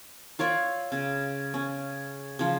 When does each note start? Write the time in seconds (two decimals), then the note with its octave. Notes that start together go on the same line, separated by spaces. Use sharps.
0.39 F4 C#5 D5 E5
0.92 C#3
1.54 C#4
2.39 C#3 F3